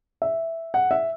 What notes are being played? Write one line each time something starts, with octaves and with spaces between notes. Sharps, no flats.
E5
F#5
E5